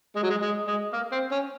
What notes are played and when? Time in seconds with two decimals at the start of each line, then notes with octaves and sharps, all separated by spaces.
0.16 G#3
0.23 F#3
0.30 G#3
0.42 G#3
0.67 G#3
0.93 A#3
1.12 C4
1.31 C#4